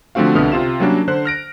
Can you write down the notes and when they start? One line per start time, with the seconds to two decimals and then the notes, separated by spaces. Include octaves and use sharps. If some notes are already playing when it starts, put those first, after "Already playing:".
0.15 D3 F3 A3 C4 F#4 F5
0.35 C2 B2 D3 B3 D#6 F6
0.52 C3 F4 E7
0.80 F#3 G3 A#3 C#4 D4
1.08 D3 C5 F#6
1.25 F6 A#6 D7